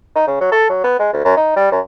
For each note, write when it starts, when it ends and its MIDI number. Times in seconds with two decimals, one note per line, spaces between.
0.16 0.27 63
0.27 0.36 49
0.41 0.52 54
0.52 0.67 69
0.69 0.81 54
0.84 0.95 59
0.99 1.09 56
1.13 1.21 38
1.25 1.36 42
1.37 1.55 63
1.56 1.71 55
1.72 1.80 42